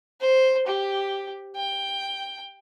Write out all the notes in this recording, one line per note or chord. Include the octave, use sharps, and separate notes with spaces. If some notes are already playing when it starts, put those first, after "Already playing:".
C5
G4
G5